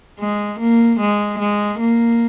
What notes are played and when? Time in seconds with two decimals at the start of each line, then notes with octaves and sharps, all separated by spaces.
0.19 G#3
0.59 A#3
1.00 G#3
1.39 G#3
1.80 A#3